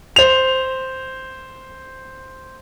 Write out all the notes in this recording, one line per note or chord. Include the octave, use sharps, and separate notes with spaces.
C5 F7